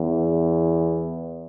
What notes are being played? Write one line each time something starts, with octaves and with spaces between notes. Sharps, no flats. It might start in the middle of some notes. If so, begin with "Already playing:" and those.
Already playing: E2